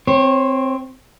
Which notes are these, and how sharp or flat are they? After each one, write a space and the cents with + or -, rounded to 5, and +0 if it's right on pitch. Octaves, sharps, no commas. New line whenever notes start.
C4 +0 C#5 -25